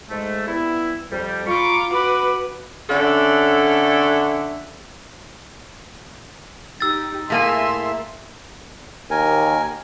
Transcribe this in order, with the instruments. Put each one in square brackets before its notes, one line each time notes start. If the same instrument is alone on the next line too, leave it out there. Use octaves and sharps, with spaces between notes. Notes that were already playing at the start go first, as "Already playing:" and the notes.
[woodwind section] G#2 G#3 A3
G3 B3 E4
F2 G3
[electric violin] F4 D6 [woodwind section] A#5 B5 C#6
[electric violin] F#4 B4 [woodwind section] B5 D6
[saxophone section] D3 C#4 A4 D5 E5 F#5
[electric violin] D#4 G4 [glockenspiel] E6 A6
[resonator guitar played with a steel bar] A2 A#3 G#5 [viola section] G#4 E5 [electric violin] C6
[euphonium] D#2 [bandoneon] A#4 G#5